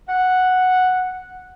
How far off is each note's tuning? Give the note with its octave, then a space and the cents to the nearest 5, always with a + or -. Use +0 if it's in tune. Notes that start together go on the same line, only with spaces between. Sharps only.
F#5 -5